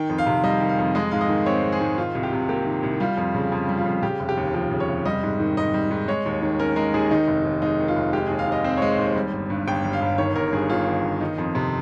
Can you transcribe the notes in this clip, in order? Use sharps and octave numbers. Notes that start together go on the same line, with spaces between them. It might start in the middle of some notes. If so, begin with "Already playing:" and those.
Already playing: D#3 G5
F2
F5
C3
G3 D#5
D#3
F5
F2
G#3 D#5
G#2 F5
D#5
D#3
C4 C#5
G#3
G#4
G#2
D#3 F4
C2
G4
C3
A#3 G4
D#3
C2
G3 F4
F2
C#3
F2
G3
F4
F2
C#3 G4
F1
G4
D#2
F3 G4
C#3
C#5
F1
G3 D#5
G#2
D#3
G#2 D#5
G3
G#2
G#3 C#5
D#2
D#3
C#4 A#4
G#3 A#4
D#2 G#4
D#3 D#4
F1
D#2
G#3 D#4
D#3
F4
F1
G#3 G4
D#2 G#4
F5
D#3 D#5
C4 C5
G#3 C#5
C5
D#2
G3
G1
G2
G1 G5
G3
F5
G1
D#3 C#5
G1 A#4
G2 G#4
G1 F4
D#3
G1
D#3 D#4
F2
C3